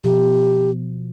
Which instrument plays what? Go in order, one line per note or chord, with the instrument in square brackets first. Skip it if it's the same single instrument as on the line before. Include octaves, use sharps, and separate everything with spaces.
[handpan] B2 F3 [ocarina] G4